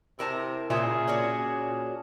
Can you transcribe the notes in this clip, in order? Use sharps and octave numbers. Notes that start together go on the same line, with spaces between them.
C3 E4 A#4 A5
A#2 C#3 F4 G#4 E5
C#4 D4 F#4